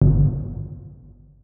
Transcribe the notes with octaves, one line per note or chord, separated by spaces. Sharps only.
G1